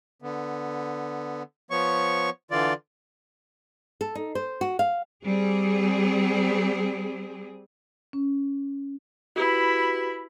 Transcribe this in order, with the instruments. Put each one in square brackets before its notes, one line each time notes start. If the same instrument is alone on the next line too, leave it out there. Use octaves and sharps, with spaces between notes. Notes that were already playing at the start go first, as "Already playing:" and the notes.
[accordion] D3 B3
F3 B3 C#5 C#6
D3 E3 F4 D5
[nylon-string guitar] A4
D#4
C5
F#4
F5
[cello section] G3 C4 G#4
[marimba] C#4
[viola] E4 B5 [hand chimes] F#4 G4 B4